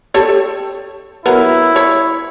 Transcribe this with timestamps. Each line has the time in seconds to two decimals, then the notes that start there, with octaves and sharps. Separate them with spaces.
0.14 G4 A4 C#5
1.26 F#3 B3 E4 A#4
1.76 C#5